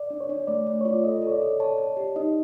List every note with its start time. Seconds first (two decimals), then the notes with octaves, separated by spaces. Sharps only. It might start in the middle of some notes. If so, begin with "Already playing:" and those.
Already playing: D5
0.10 D4
0.21 C#5
0.29 D4
0.47 A3 D5
0.67 A3
0.81 F4 C#5
0.93 D5
1.04 A4 D#5
1.22 A4
1.27 C#5
1.32 D5
1.42 A4
1.60 C#5 A5
1.78 A5
1.97 G4
2.16 D#4 D#5